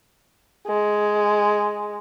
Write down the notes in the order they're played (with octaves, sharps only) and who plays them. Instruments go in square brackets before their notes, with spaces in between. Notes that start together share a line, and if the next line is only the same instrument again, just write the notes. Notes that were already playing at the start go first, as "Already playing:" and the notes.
[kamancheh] G#3